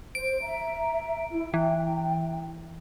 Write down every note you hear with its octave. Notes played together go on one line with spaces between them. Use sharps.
C5 D7
E5 A#5
E4
E3 G5